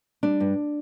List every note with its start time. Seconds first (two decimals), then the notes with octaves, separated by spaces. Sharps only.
0.23 G3 D4
0.40 G2